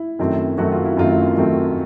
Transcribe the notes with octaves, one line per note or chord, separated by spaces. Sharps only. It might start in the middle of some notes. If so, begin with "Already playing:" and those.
Already playing: E4
F#2 D#3 F#3 A3 C4
F#2 D#3 F#3 A3 C4 F#4
F4
E4
F#2 D#3 F#3 A3 C4 F4
F#2 D#3 F#3 A3 C4